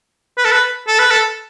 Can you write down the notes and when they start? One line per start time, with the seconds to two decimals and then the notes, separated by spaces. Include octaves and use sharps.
0.38 B4
0.45 A4
0.52 B4
0.88 A4
0.99 B4
1.11 A4